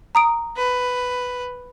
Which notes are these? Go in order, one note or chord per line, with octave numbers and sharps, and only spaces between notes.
A#5 D#6 D7
B4